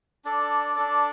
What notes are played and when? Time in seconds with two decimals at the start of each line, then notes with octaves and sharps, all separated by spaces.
0.25 D4 A4 D5
0.76 D4 A4 D5